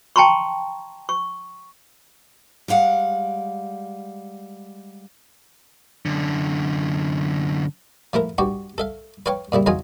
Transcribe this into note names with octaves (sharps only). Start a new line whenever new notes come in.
G5 A5 A#5 C6 C#6
C#6
G3 G#3 F5 F#5
F#2 D3
F3 A3 E4 A#4
G2 F#4 G4 C#6
A4 E5 F5
B4 C#5 F5 G5 C#6
A#2 C#3 G3 E4
E2 C#3 F#3 D#4 F4 G#5